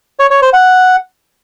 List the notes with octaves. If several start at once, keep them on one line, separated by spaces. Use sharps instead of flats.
C#5
C#5
C5
F#5